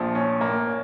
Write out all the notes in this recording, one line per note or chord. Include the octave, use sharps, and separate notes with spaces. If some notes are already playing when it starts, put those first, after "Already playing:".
Already playing: A#1 A#2 F3
C#4
A#3
C#4